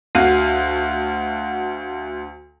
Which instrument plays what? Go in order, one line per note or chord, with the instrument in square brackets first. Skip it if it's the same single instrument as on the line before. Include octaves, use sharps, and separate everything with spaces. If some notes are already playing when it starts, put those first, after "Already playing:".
[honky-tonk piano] D2 F#4 F5 C7 D#7